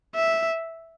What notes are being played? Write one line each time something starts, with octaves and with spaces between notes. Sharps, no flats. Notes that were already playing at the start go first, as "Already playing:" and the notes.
E5